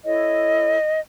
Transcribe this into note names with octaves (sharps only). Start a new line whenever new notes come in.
E4 A4 C#5 D#5